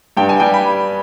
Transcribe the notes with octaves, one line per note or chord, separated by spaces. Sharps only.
G2 G5
G#5
G3 G5
B5